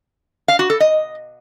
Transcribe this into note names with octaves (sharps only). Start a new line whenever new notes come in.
F5
F#4
A4
D#5